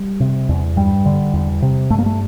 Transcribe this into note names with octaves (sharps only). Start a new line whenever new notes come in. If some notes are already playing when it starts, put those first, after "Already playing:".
Already playing: G3
C3
E2
G2 G3
D3
E2
C3
G2 A3
A#3
A3